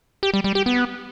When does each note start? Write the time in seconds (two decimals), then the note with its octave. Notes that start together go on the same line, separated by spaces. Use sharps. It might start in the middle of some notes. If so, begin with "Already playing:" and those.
0.23 G4
0.34 G3
0.44 G3
0.55 G4
0.66 B3